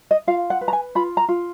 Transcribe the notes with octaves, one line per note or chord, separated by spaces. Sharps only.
D#5
F4 F5
F#5
B4
A#5
G#5
F4 B5
A#5
F4